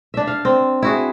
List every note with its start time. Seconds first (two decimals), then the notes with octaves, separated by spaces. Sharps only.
0.14 D4 E5
0.27 F5
0.45 C4
0.83 E4 F#4 G#4